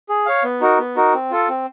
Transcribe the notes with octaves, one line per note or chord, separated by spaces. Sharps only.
G#4
C#5 F5
B3
D#4 F#4 A#4
B3
D#4 F#4 A#4
C4
F4 A4
C4